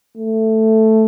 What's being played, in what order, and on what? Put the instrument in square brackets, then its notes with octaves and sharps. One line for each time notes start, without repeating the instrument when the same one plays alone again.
[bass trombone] A3